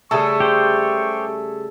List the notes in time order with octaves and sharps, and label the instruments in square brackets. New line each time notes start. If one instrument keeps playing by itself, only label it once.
[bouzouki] C#3 G3 A3 [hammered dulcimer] G#4 A4 [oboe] C#6
[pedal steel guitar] G4 C5